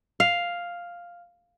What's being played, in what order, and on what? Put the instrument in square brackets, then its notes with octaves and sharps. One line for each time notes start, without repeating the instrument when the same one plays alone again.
[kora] F5